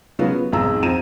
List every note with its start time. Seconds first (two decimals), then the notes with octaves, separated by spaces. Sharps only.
0.19 C#3 F#3 G#3 B3 F4 F#4
0.32 B3
0.52 B1 F2 G#2 G#4 A#5 E6
0.82 F2 C4 F4 A#5 D#7 E7